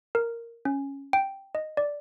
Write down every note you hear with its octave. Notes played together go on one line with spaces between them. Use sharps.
A#4
C#4
G5
D#5
D5